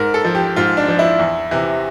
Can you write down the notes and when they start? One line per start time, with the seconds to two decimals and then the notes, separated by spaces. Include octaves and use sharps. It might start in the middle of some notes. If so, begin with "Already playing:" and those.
Already playing: G#2 A#4
0.14 A4
0.25 F3
0.35 G4
0.56 G#2 F4
0.77 D4
0.88 F3
0.99 E4
1.19 E2
1.51 C3 E3